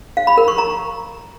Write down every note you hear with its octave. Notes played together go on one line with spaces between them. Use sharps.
F5
B5
A#4
C#6
A#5